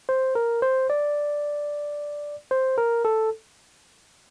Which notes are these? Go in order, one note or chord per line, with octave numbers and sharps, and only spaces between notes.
C5
A#4
C5
D5
C5
A#4
A4